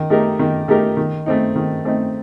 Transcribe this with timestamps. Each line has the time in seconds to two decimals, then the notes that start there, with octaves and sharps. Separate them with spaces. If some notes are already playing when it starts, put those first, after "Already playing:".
Already playing: D#3
0.10 A3 D#4 G4 A#4
0.39 D#3
0.68 A3 D#4 G4 A#4
0.97 D#3
1.26 A3 C4 D#4
1.55 D#3
1.85 A3 C4 D#4